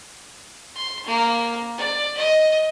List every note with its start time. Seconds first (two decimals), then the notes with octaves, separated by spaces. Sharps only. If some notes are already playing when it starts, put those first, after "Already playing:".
0.75 C6
1.06 A#3
1.78 D5
2.17 D#5